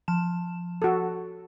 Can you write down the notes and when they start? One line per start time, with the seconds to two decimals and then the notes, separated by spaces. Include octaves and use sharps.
0.08 F3 A5 E7
0.82 F#4 A4